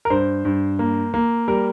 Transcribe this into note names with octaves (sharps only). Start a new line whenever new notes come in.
A#4
G2 C5
G2
A#3
A#3
G3 A#4